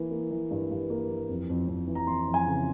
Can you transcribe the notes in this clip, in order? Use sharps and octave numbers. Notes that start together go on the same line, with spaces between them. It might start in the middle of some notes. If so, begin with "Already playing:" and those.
Already playing: E3 A#3
A#3
E3
G2
G2
A#3
E3
F2
F2
F2
E3
A#5
E3 C6
F2
G#5
C#3